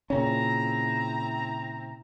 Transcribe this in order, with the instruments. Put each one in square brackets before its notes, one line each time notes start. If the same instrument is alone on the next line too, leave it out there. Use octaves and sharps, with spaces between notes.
[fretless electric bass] A#2 C#3 C#4 [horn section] C4 E4 A#5